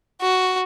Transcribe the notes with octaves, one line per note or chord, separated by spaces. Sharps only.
F#4